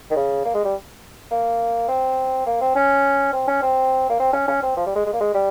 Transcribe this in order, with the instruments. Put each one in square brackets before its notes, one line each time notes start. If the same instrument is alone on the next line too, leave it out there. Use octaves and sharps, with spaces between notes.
[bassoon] D#3
C#3
A#3
G#3
G3
A#3
C4
A#3
C4
C#4
C4
C#4
C4
A#3
C4
C#4
C#4
C4
F3
G3
G#3
G#3
A#3
G#3
G3